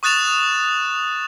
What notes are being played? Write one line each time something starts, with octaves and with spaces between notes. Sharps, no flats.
C#6 D#6 F#6 A6 E7 F7